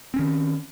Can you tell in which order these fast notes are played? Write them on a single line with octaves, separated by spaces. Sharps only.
C4 C#4 D#3